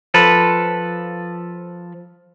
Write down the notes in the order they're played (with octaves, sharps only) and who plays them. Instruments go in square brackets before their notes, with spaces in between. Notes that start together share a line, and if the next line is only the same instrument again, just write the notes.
[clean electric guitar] F3 A4 B4